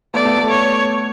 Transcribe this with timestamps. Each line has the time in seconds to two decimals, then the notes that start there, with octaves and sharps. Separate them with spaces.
0.14 A3 B3 D5
0.25 A3 B3
0.37 A3
0.50 C#5